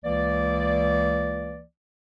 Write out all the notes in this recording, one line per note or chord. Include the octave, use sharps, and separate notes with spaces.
C#2 E3 A#3 D5